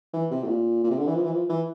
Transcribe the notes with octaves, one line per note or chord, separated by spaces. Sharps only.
E3
C3
A2
A#2
A#2
C3
D3
E3
F3
E3
F3
E3